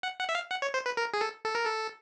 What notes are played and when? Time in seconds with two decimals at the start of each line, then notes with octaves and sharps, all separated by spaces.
0.03 F#5
0.19 F#5
0.29 E5
0.35 F5
0.51 F#5
0.62 C#5
0.74 C5
0.86 B4
0.97 A#4
1.14 G#4
1.21 A4
1.45 A4
1.55 A#4
1.65 A4